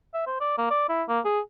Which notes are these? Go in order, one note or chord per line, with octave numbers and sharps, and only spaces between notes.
E5
C5
D5
A#3
D5
E4
A#3
G#4